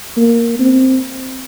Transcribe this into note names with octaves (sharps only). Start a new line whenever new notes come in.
A#3
C4